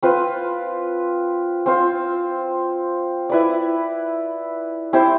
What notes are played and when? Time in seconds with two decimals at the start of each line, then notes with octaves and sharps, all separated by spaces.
0.03 C4 F4 B4
1.66 C4 F4 C5
3.29 E4 B4 D5
4.93 C4 E4 G4 C5